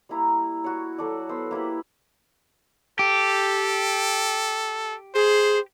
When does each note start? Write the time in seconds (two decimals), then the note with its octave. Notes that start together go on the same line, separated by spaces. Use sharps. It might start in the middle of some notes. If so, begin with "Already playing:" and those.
0.09 G3 A#3 E4 A#5
0.64 F#4 C#5
0.98 F#3 A4 D5
1.29 B3 C5 E6
1.51 A#3 E4 G4 B4
2.99 G4 A4
5.15 G#4 C5